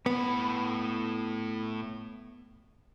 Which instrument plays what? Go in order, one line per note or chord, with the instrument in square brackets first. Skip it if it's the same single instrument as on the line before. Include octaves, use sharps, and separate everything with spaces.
[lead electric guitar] A2 B5 [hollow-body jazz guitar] B3